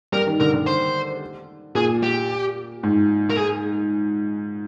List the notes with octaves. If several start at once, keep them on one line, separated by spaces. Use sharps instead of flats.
G3 A#4
D#3
D3 A#4
D3
C5
A#2 G#4
G4
G#2
A#4
G#4